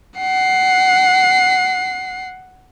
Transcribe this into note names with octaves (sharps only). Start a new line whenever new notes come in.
F#5 C7